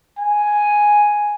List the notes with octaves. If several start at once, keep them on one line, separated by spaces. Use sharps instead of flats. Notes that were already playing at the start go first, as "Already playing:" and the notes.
G#5